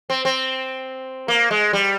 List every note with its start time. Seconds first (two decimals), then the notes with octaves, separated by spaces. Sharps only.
0.10 C4
0.25 C4
1.28 A#3
1.51 G#3
1.73 G3